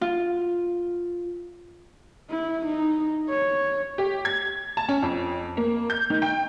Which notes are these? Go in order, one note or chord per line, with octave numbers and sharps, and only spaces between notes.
F4
E4
D#4
C#5
G4
G#6
A5
C#4
F2
A#3
G6
D#3
G5